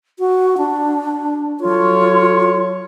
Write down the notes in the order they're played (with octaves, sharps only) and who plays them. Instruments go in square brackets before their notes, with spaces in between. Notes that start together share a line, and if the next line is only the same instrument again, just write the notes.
[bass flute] F#4
D4
[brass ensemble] F#3 A4 C#5 [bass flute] F4